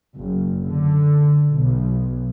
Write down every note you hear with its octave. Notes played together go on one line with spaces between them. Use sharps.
F#1
D3
B1